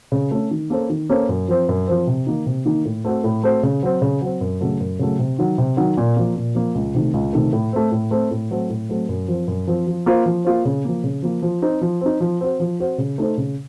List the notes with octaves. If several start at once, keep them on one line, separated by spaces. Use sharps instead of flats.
C#3
A3 C#4
D#3
A#3 C#4 A4 C5
D#3
A#3 C#4 A4 C5
F#2
F3 C4
F#2
F3 C4
C3
D#3 A#3 D#4
C3
D#3 A#3 D#4
A2
A3 C4 F#4 C5
A2
A3 C4 F#4 C5
C#3
F#3 C4
C#3
F#3 C4
F#2
C#3 F#3 A3
F#2
C#3 F#3 A3
C3
D#3 F#3
C3
D#3 F#3
A#2
F3 A#3
A#2
F3 A#3
C#2
C3 D#3 A3
C#2
C3 D#3 A3
A2
A3 C4
A2
A3 C4
A2
F#3 A3 C4
A2
F#3 A3 C4
F#2
F3 C4
F#2
F3 C4
F3
A#3 F4 C5
F3
A#3 F4 C5
C#3
F3 A#3
C#3
F3 A#3
F3
C4 D#4
F3
C4 D#4
F3
C4 F#4 C5
F3
C4 F#4 C5
C#3
A3 D#4 A4 C5
C#3